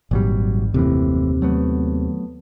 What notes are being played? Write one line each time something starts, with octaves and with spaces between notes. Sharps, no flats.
G#1 A#2 F#3 G3
F#1 D#2 A2 C3 E3
F#3 A3 B3